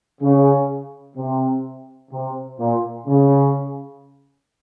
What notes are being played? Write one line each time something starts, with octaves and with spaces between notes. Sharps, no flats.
C#3
C3
C3
A#2
C#3